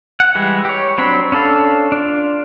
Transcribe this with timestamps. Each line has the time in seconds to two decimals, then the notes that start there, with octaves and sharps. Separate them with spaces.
0.20 F#5
0.35 E3 G3 G#3
0.65 G4 C#5
0.98 F#3 C4 D4 B5
1.32 C#4 D4 A4 F5
1.92 D4 F4